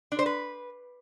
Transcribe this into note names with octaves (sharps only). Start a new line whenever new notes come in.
D4
C5
B4